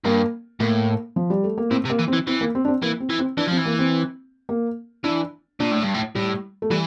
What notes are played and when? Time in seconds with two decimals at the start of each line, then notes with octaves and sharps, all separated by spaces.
0.05 G2 A#3
0.60 A2 A#3
1.16 F3
1.30 G3
1.44 A3
1.58 A#3
1.71 A2 C4
1.85 C3
1.90 A#3
1.99 E3
2.08 C4
2.13 E3
2.27 E3 C4
2.41 A#3
2.55 C4
2.65 D4
2.68 C4
2.82 E3 A#3
3.00 C4
3.10 E3
3.19 C4
3.37 E3 D4
3.48 F3 C4
3.57 E3
3.66 A#3
3.79 C4
4.49 A#3
5.04 E3 D4
5.60 A#2 D4
5.71 A2
5.83 G2
5.94 A2
6.15 A2 G3
6.62 A3
6.70 E3 G3